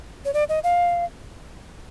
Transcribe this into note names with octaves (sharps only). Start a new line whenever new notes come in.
C#5
D5
D#5
F5